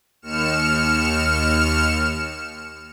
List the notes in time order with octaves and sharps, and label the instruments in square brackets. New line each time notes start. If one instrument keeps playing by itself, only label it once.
[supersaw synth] D#2 F6 C#7 E7